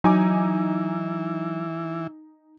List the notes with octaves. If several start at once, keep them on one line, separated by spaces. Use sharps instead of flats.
E3 F#3 D#4 G#5 D6